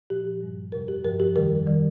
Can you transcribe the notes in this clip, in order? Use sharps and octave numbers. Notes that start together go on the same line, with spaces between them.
A#2 F3 G4
G2 G3
F2 C3 G3 A#4
G4
G2 F3 A#4
G4
F2 C3 D#3 G3 A#4
D#3 G3